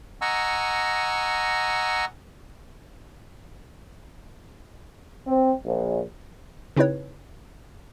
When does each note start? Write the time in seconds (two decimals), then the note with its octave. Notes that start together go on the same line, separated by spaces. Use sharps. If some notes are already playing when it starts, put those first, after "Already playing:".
0.21 D#5 F#5 G#5 A#5 C#6 E6
5.27 C4
5.65 A#1
6.76 C#3 C4 D#4 E4 B4 C#5